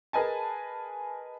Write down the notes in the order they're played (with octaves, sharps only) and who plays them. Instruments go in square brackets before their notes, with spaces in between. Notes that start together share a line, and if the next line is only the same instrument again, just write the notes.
[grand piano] G#4 A#4 B4 D#5 G#5 A5